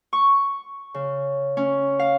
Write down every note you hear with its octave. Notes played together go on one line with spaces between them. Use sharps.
C#6
C#3
C#4
F5